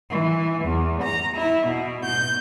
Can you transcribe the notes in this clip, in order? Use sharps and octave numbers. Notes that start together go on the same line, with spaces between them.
E3
E2
A#5
E4
B2
G6